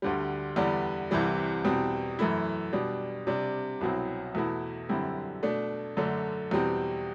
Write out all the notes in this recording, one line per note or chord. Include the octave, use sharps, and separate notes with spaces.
D2 D3 G3
E2 D3 G3 B3 D4
C2 C3 E3 G3
E2 B2 G3 C4
F#2 E3 A3 E4
B2 G3 D4
C3 G3 D4
C2 B2 F#3 C4 E4
E2 B2 A3 E4
F#2 D3 G3 C4 E4
B2 A3 D4
F#2 D3 A3 D4
E2 B2 G3 C4